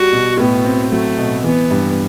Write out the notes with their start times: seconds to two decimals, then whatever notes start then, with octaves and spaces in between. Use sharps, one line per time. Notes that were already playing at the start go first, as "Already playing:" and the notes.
Already playing: G3 F#4
0.13 B2
0.39 A2 B3
0.65 C4
0.92 F#3 A3
1.18 B2
1.44 E3 B3
1.71 G2